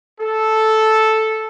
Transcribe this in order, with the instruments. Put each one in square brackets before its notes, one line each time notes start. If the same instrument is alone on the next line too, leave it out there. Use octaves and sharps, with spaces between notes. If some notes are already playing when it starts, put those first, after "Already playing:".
[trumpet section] A4